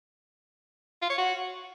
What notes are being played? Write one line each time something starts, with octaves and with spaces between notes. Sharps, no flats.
F4
C#5
F#4